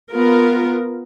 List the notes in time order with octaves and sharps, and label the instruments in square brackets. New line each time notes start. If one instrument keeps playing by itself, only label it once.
[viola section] B3 F4 A#4